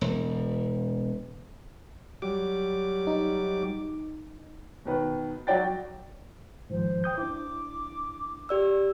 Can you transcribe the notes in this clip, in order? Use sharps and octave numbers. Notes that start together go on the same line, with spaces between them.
E1
F#3 G3 D6
D#4
B2 D#3 B4
F#3 F#4 D5 G5 A6
G#2 D#3 F3 C5
G5 D#6 G6
D4 E4 D6
G4 D5 E6